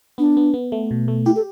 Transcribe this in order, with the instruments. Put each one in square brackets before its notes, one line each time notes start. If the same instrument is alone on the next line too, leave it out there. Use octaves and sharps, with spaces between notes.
[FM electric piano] B3 [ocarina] D4
[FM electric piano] B3
B3
A3
B2
A3
[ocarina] E4 [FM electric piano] G4
[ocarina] A4